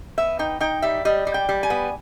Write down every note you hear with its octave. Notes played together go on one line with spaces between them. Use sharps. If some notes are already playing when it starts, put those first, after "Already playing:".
B3 E5
D#4 G5
D#4 G5
G3 E5
G3 D#5
G3
G5
G3
G#5
B3